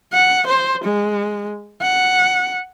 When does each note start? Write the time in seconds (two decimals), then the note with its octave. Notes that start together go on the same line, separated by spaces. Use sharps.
0.13 F#5
0.47 C5
0.84 G#3
1.82 F#5